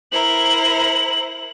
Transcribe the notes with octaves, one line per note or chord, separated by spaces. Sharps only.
E4 A#4 C5 F#7